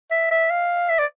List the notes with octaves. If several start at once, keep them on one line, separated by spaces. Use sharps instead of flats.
E5
E5
F5
E5
D5